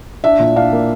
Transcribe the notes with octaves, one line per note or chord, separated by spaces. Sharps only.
D4 E5
A#2
D4 F5
A#3